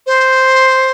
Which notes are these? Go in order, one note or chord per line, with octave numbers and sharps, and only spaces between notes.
C5